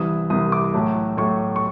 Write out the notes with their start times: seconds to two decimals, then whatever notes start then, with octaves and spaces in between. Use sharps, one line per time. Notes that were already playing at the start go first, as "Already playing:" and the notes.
Already playing: C2 C3 E3 D#6
0.30 C2 C3 E3 D#6
0.52 D6
0.74 A2 F#3 A3
1.17 A2 F#3 A3 C#6
1.56 C#6